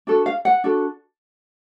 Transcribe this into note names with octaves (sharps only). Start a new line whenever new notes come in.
D4 F#4 A4
F5
F#5
D4 F#4 A4